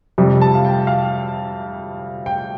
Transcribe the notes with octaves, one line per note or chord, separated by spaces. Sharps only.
F2 C3 G3
A5
F5
G5
F5
G5